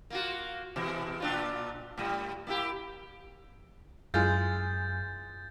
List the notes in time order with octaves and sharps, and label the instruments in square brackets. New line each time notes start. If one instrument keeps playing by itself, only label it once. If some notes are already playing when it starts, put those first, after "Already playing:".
[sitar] A#3 F4 F#4
B2 E3 G#3
A#2 D4 F4
A2 G3
A#3 E4 G4
[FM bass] F#2 [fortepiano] E3 G#3 F4 [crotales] G6 A6